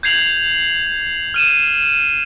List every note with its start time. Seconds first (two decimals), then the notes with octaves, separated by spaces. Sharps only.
0.03 G6 G#6 C7 F7 F#7
1.34 F6 D#7 E7